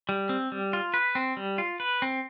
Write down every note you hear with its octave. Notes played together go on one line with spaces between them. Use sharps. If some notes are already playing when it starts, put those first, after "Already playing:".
G3
C4
G3
F4
B4
C4
G3
F4
B4
C4